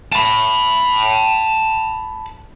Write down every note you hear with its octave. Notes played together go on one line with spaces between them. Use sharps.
A5 B5